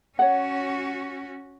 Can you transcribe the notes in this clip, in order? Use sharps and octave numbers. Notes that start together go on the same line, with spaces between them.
C#4 F#4 C#5 F#5